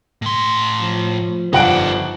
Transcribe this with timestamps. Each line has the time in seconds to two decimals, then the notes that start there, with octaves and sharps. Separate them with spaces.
0.22 A2 C6
0.81 F3
1.53 G1 F3 D#4 D5 F#5 D7